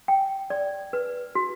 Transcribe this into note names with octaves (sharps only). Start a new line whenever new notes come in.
G5
D5
B4
F#4